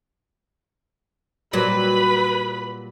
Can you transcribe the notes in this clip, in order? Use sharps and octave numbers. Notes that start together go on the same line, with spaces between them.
A#2 F#3 G3 B4 B5